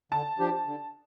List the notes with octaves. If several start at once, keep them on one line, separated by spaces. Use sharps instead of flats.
D3 A5
F3 D4 G4
D3